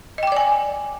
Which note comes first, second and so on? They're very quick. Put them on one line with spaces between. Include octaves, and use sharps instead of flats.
D#5 G5 D6 D5 G#5